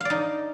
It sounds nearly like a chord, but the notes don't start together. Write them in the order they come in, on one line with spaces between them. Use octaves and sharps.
F5 D5 D#4